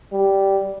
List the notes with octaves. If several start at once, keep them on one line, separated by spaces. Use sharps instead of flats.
G3